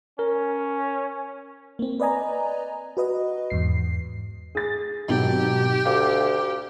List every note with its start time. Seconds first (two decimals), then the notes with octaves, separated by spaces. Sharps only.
0.19 C#4 A#4
1.79 A#3 C4
2.00 B4 D5 D#5 G#5 A#5
2.97 F#4 B4 D#5
3.50 E2 G#2 C7
4.55 G#4 A6
5.08 G#1 B2 F#3 G4
5.85 D2 F5 D6